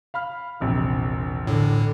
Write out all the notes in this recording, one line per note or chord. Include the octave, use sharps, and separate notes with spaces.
F5 B5 F6
E1 A#1 C3
A2 D3